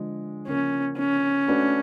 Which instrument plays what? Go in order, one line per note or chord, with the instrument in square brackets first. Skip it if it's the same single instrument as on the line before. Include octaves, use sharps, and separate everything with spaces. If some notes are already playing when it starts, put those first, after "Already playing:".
Already playing: [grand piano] D3 F3 G#3
[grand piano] C#3 F3 A#3 [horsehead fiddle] C#4
[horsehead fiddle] C#4
[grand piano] A3 D4 F#4 B4